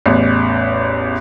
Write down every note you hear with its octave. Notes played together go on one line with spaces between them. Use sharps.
A1 E2